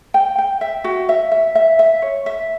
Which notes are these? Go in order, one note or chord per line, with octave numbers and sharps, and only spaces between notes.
G5
G5
E5
F#4
E5
E5
E5
E5
C#5
E5